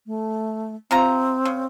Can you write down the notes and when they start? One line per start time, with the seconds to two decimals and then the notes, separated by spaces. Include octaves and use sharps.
0.06 A3
0.91 C3 C4 F4 A#5
1.45 C#3